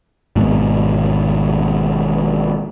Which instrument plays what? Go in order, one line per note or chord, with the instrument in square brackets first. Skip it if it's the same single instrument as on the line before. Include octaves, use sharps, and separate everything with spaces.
[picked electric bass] G#1 G#2 B2